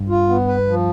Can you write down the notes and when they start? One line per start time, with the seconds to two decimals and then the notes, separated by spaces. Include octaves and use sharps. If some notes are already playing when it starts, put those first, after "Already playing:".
Already playing: G2
0.09 F4
0.29 B3
0.47 B4
0.68 F3